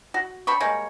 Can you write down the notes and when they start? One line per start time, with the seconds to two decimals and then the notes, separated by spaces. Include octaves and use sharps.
0.14 F#4
0.47 C4 D4 B5 C#6
0.60 G3 G#3 A#3 C#5